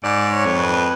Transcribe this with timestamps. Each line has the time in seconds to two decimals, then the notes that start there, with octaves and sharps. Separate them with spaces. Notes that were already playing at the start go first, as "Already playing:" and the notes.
0.04 G#2 D5
0.32 C#5
0.46 F2
0.60 B4